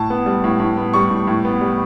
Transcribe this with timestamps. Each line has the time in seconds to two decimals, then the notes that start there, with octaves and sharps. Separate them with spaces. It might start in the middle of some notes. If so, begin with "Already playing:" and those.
Already playing: A2 A5
0.10 B3
0.26 G3
0.44 A2
0.60 A2
0.77 B3
0.94 G3 C#6
1.10 A2
1.27 A2
1.45 B3
1.61 G3